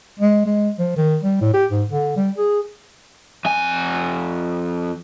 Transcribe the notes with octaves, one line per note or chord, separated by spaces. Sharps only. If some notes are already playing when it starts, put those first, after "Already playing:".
G#3
G#3
F3
D#3
G3
A2
G4
G#2
D3
G3
G#4
F2 G#5